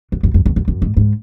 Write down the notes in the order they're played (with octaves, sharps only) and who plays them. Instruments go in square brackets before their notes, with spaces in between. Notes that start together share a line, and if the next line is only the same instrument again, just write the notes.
[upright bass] F#2
F#2
F#2
E2
F#2
F#2
G#2
G#2